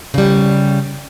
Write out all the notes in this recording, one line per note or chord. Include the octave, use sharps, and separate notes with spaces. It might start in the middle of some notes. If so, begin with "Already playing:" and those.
C#3 G3